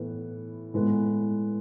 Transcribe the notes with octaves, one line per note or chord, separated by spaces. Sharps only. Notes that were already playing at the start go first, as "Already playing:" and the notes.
Already playing: A2 E3 B3
A2 G#3 B3